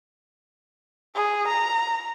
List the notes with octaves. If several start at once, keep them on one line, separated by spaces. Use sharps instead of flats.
G#4
A#5